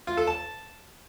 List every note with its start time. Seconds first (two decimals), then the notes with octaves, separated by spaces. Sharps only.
0.07 F4
0.17 A4
0.27 A5